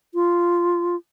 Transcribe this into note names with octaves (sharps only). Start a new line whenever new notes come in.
F4